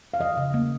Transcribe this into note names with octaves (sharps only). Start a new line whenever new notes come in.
F5
F3 D#5
C#3
A#3